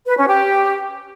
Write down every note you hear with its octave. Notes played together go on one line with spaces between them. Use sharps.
B4
C#4
G4